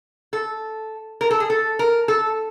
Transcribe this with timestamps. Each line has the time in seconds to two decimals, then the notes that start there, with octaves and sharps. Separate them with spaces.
0.33 A4
1.21 A#4
1.31 A4
1.40 G#4
1.50 A4
1.79 A#4
2.08 A4